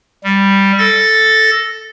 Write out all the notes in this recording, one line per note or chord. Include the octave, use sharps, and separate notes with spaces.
G3
A4 A6 A#6